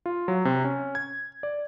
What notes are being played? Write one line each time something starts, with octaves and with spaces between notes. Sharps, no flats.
F4
F#3
C3
C#4
G#6
D5